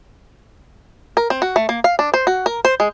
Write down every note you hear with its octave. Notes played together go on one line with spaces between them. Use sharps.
A#4
C4
F#4
A3
A#3
F5
D4
C5
F#4
A#4
C5
G#3